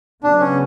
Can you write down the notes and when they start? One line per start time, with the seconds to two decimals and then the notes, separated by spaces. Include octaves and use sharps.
0.24 C#3 F#3 B3 D4
0.40 C#4